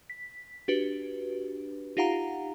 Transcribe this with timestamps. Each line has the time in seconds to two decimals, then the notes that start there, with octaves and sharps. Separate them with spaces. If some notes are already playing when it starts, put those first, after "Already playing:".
0.10 B6
0.68 D4 F#4 G4 B4
1.97 D#4 F4 G4 F5 F#5 A#5